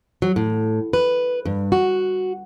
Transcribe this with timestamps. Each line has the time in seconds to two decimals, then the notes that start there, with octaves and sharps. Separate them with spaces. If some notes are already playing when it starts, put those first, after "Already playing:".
0.22 F#3
0.36 A2
0.93 B4
1.45 G2
1.72 F#4